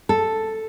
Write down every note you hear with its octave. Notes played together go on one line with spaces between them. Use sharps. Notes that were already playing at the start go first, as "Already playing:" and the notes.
A4